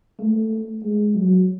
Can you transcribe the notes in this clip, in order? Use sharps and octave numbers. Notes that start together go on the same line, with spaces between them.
A3
G#3
F#3